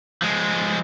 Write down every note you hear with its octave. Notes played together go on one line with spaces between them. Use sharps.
F3 G#3